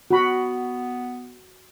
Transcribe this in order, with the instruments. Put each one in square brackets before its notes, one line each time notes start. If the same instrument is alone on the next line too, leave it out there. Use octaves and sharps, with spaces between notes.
[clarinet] B3 [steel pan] F#4 B5